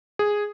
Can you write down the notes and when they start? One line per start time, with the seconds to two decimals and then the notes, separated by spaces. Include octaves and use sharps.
0.19 G#4